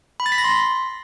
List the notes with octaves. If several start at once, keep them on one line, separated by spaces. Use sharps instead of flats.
B5
A6
B6
A#6
C6